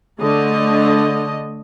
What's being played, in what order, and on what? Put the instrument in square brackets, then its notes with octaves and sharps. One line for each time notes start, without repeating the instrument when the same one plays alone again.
[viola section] D3 A3 D#5